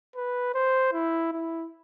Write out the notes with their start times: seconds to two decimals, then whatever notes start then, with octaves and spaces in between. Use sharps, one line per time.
0.16 B4
0.54 C5
0.93 E4
1.32 E4